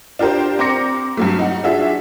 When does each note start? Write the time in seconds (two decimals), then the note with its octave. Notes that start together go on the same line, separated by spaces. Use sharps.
0.19 D4 F4 G4 A#4 C5
0.59 C4 A#5 C6 D6 A#6 C#7
1.17 G2 F#3 A3
1.39 D#4 F#5
1.64 D4 F4 F#4 G#4 E5